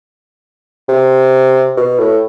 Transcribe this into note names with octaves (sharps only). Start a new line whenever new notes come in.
C3
B2
A2